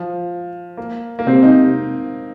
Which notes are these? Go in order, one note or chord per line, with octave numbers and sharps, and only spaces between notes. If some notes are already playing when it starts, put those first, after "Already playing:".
Already playing: F3
A#3
A#3
C3 C4
D#4